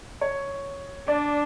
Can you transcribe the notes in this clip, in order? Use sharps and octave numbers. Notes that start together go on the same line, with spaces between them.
C#5
D4 D5